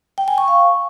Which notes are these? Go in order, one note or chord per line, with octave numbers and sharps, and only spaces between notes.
G5
G#5
C#6
F5